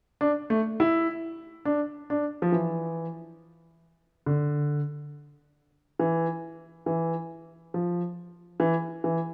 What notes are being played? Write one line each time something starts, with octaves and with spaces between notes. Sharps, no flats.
D4
A3
E4
D4
D4
F3
E3
D3
E3
E3
F3
E3
E3